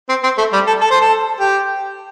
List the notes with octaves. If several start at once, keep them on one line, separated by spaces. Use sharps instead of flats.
C4
C4
A3
G3
A4
A4
C5
A4
G4